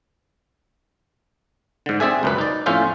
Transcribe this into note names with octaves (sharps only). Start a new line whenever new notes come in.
G#2 D3
C4 G#4 D5 E5 G#5
C#2 F#2 B4
D#4 D5
F2 A2 C#4 F4 C5 E5